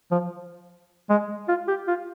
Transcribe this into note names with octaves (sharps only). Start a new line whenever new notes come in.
F3
G#3
F4
G4
F4